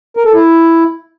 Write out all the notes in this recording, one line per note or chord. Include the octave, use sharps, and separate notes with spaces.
A#4
A4
E4